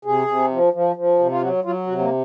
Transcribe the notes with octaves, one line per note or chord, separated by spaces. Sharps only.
C3 G#4
C3
F3
F3
F3
C3
F4
F#3 F#4
F#3 F4
C3 F#4
A#3